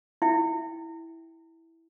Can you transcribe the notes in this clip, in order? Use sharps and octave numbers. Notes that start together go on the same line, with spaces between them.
E4 E5 G5